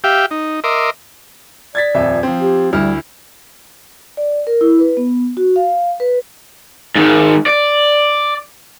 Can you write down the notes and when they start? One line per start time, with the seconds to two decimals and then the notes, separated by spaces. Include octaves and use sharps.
0.04 G4 E5 F5 G5
0.31 D#4
0.64 A#4 D#5 E5 C6 D6
1.75 D5 G#6 A6 B6
1.95 D#1 F2 E5
2.23 F3 C4
2.41 G4
2.73 D2 G3 E4 F6
4.17 D5
4.47 A#4
4.61 E4
4.79 B4
4.97 B3
5.37 F#4
5.56 F5
6.00 B4
6.96 G#2 D#3
7.46 D5